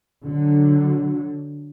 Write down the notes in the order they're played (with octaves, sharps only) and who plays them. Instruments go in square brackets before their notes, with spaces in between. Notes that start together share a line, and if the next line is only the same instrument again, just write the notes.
[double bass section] D3 F#3